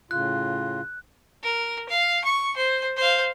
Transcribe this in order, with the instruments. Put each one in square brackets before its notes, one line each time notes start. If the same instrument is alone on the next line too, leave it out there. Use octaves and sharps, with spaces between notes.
[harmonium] A2 C#3 F4 [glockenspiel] F#6
[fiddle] A#4
F5
C#6
C5
C5 F5